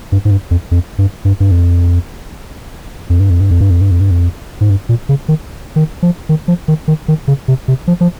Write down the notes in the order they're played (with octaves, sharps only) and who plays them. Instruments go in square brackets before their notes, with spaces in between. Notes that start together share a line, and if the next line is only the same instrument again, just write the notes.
[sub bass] G2
G#2
G2
F2
F2
G2
G2
G2
F2
F2
G2
F2
G2
F2
G2
F2
G2
F2
G2
F2
G#2
G2
A#2
C#3
D#3
D#3
F3
D#3
F3
D#3
D#3
D#3
C#3
C3
C3
F3
F3